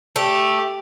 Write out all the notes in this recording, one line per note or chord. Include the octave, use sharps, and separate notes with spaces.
A3 G4